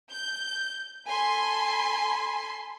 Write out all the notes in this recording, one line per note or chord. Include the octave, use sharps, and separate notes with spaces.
G6
A4 G#5 B5 C6